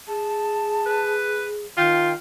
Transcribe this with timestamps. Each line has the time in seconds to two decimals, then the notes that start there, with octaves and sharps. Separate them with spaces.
0.08 G#4 A5
0.86 B4
1.77 D#3 F4 G5